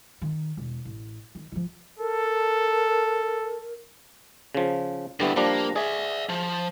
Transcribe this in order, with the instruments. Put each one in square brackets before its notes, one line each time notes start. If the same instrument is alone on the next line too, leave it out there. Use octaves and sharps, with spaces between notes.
[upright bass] D#3
E1
A1
D#3
D#3 F3
[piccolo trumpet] A4 [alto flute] A#4
[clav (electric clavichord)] C#3 F3
[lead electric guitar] G2 E4 [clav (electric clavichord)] D3 G3 B3
[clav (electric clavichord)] F3 G3 D4 [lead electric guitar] A#3
[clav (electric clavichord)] G#4 [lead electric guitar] D5 E5
[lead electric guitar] F3